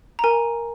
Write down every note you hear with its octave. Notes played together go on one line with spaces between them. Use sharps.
A#5
A#4 G#5